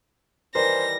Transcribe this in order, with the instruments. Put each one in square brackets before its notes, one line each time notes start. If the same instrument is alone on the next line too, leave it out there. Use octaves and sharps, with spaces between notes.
[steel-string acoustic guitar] D#3 E3 G3 [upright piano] A#4 [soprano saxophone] C5 [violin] A#6